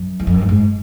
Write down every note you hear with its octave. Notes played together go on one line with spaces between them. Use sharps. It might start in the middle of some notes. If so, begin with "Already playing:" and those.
Already playing: F#2
E2
F2
F#2
G2
G#2